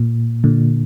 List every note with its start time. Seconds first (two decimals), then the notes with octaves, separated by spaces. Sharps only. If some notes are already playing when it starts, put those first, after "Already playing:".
Already playing: A#2
0.44 A#2 D3